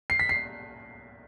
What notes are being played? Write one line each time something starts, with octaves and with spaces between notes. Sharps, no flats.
C7
B6
C7